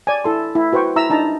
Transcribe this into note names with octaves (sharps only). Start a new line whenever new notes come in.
D5 G#5
E4 A4 C6
E4
F#4 B4 C5 G5 C#6
E4 E5 A#5 E6
D4 D#4 A5 A#5